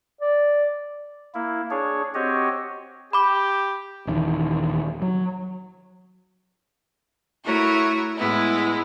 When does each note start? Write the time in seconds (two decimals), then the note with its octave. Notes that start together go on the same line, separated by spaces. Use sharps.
0.21 D5
1.35 A#3 E4
1.71 D4 G#4 C#5
2.15 C4 F#4 G4 C#5 D#5
3.13 G4 B5 D6
4.07 D#1 D#2 E3
5.02 F#3
7.45 A3 E4 F#4 A#4 C#5
8.17 A2 G#3 B3 E4